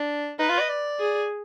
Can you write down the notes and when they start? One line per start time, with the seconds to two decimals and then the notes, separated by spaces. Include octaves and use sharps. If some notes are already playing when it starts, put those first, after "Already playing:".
Already playing: D4
0.39 D#4 B4
0.49 F4
0.60 D#5
0.69 D5
1.00 G#4